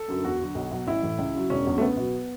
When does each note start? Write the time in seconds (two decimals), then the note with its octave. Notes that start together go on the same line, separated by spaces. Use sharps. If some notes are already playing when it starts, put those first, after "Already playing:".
Already playing: A4
0.08 F#2 D3 F#3
0.24 E2 F#4
0.40 D3 F#3
0.55 B1
0.71 B2 F#3
0.87 A1 E4
1.03 A2 E3
1.18 C#2
1.35 C#3 F#3
1.50 E1 C#4
1.67 E2 D3 F#3
1.78 A3
1.81 C#2 B3
1.97 B2 F#3